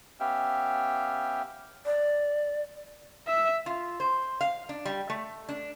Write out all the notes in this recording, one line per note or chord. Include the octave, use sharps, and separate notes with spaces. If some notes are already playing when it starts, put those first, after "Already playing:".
B3 C#4 G4 E5 F5 G5
D5
E5 E6
F4
C5
F5
D4
G3
A3
D4